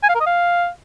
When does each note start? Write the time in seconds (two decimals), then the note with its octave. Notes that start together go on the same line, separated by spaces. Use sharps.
0.03 G#5
0.09 F5
0.15 A#4
0.21 D#5
0.26 F5